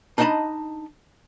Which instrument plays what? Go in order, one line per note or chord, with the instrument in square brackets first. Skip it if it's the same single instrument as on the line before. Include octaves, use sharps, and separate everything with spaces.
[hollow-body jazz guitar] D4 D#4 D#5 F#5 A5 B5